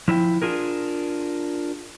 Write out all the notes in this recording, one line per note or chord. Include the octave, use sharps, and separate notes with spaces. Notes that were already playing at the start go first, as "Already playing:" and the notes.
F3 E4 D#5 G5
D4 F4 G#4 A#4